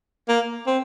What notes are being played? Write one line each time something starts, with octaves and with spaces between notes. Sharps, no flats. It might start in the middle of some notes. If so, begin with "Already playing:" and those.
A#3
C4